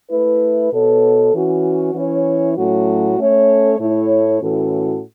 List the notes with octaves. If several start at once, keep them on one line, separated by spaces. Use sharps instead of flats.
A3 E4 B4
B2 B3 A4 C#5
E3 C#4 F#4
E3 C#4 E4 C#5
A2 F#3 A3 C#4 F#4
A3 C#4 A4 C#5
A2 A3 E4 C#5
A2 E3 C#4 F#4 A4